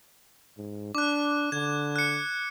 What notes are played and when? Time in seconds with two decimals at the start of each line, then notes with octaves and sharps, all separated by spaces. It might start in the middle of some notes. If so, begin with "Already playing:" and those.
0.58 G#2
0.95 D4 D6 F#6
1.52 D3 G#6
1.96 F#6 C#7